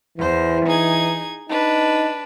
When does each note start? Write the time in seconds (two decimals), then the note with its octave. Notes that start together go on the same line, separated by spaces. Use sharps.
0.18 E2 E3 C5
0.66 D#4 G#4 G#6
1.49 D4 D#4 B4